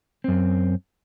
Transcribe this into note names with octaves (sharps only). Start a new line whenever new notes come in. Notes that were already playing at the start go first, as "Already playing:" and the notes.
F#2 C4